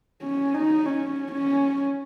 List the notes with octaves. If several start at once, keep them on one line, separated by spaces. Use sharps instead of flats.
C#4
D#4
C#4
C#4